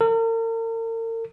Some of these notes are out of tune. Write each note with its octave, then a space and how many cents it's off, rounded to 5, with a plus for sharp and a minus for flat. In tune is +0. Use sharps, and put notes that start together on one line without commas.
A#4 -40